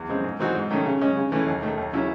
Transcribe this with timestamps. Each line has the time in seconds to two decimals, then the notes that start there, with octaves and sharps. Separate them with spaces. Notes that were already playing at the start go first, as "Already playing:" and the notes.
Already playing: E2
0.09 C#3 G#3 C4
0.24 G#2
0.40 E3 C4 D#4 F#4
0.55 G#2
0.71 D#3 A3 C#4
0.86 C#3
1.01 G#3 C#4
1.16 C#3
1.32 E3 A3 C#4
1.47 D#2
1.62 D#3 A3
1.78 D#2
1.93 C#3 F#3 C#4 E4